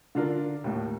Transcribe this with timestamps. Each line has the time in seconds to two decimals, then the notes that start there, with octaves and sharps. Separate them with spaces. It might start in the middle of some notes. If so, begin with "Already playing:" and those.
0.15 D3 D4 F4 A#4
0.64 D#2 A2